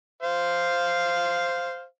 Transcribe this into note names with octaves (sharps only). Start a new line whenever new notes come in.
C5 F5